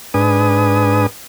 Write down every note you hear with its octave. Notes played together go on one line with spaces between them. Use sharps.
G#2 D4 B4 G#5 D#6